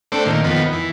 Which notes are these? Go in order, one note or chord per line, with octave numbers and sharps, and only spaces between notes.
A3 C4 D4
A#2 D#3
F2 D#3 B3
E3